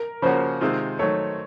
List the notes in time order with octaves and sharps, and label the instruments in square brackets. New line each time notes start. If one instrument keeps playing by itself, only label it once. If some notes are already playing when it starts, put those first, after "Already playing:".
Already playing: [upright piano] A#4
[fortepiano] C#3 F3 A#3 C#4 F#4 [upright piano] C5
[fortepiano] C3 D#3 G#3 C4 F4
[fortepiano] D#3 F#3 A3 [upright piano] C#5